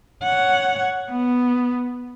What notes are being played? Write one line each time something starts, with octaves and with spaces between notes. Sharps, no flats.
C#5 F#5
B3